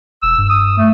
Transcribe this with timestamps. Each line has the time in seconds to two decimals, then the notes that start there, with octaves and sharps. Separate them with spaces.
0.22 E1 E6
0.38 G2
0.49 D#6
0.77 A3